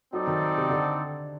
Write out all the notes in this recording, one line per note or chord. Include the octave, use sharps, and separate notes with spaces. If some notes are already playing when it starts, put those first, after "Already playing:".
F#3 C4 D#4 A4 D5
D#3
C3
D3